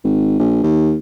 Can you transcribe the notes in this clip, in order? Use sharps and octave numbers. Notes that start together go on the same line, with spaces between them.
G#1
A#1
D#2